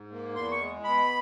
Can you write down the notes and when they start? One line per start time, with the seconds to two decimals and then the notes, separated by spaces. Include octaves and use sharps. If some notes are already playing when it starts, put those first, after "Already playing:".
Already playing: G#2
0.11 A#3
0.35 E2 C6
0.52 C#6
0.60 G#3
0.84 B2 B5